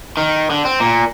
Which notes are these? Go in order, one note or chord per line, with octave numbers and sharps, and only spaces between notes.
D#3
D3
C4
A#2